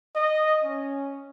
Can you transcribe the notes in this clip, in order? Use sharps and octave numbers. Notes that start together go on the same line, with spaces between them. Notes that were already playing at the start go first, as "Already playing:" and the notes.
D#5
C#4